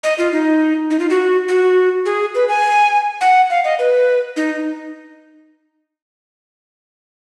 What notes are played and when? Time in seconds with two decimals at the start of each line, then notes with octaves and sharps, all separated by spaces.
0.04 D#5
0.18 F4
0.33 D#4
0.90 D#4
1.00 F4
1.10 F#4
1.48 F#4
2.06 G#4
2.35 B4
2.49 G#5
3.21 F#5
3.50 F5
3.64 D#5
3.79 B4
4.36 D#4